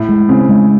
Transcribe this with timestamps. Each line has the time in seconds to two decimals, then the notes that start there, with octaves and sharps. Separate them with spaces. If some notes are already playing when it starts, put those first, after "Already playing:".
Already playing: A2
0.09 G#3
0.29 C#3 C4
0.49 G#3